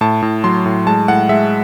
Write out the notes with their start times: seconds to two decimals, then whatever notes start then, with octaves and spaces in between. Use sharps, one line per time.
0.01 A2 A5
0.22 A2
0.44 F#3 C6
0.66 A2
0.86 G#3 A5
1.08 A2 F#5
1.29 G#3 E5